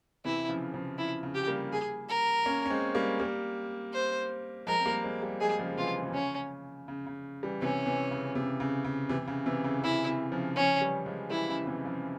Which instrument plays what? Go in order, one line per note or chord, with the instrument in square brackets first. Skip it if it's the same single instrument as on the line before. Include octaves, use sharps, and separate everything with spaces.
[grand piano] C3 E3 [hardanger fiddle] E4
[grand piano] C#3 F3
C#3 F3
[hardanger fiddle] E4
[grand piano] C#3
[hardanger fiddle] G4
[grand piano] G3 A#3
[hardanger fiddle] G#4
A#4
[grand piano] A#3 C#4
C#4
G#3 C4
G3 A#3
G3 A#3
[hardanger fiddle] C5
[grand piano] F3 G#3 [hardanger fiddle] A#4
[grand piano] C4
G3 A#3
G#3 C4
G3 A#3
[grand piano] F3 G#3 [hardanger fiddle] G#4
[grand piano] C#3 F3
[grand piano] C3 E3 [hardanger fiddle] F4
[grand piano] C#3
E3
[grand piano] C#3 [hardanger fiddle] C#4
[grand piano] C#3
C#3
E3 G3
[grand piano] C3 E3 [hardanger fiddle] C#4
[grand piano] C3 E3
C#3
C3
C#3
C#3
C3 E3
C#3
C3 E3
C#3
E3
[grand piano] C#3 [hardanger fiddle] E4
[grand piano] C3
C#3 F3
[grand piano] C#3 F3 [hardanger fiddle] C#4
[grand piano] E3 G3
F3 G#3
[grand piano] E3 G3 [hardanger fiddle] E4
[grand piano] C#3
C3 E3
C#3 F3